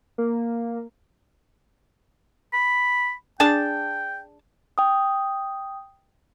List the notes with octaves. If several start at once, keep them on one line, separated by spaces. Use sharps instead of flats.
A#3
B5
D4 G#4 G5 A5
G5 D#6